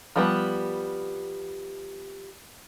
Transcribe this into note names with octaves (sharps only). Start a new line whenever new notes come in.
F3 G3 B3